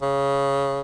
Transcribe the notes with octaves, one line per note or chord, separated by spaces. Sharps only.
C#3